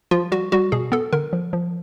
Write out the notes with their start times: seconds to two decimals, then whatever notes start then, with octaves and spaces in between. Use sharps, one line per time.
0.11 F3 F4
0.32 G3 F#4
0.52 G3 F#4
0.72 B2 G#4
0.92 B3 A4
1.13 D3 A#4
1.33 F3
1.53 F3